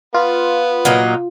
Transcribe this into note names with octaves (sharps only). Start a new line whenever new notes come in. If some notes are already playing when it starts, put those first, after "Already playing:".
B3 F4
A#2 F#3 D#4